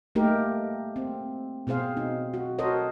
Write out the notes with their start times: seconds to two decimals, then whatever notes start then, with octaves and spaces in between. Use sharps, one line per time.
0.15 A3 A#3 D#4 G4 A#4
0.96 C4
1.67 B2 C4 G#4 C5 F5
1.97 D#4
2.34 F#4
2.59 F#4 A4 A#4 C5 C#5 D#5